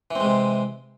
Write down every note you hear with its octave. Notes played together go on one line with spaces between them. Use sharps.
C3 E3 G#3 C4